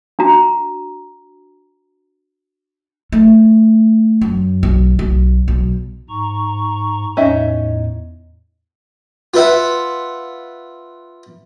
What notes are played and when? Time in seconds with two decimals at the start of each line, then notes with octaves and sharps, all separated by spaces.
0.19 D4 F#4 A#5
3.12 A3
4.22 F#2
4.63 B1
4.99 B1
5.48 B1
6.09 G#2 A#5 C#6
7.17 E2 A2 C#4 D#4 E5
9.34 F4 B4 E5 F#5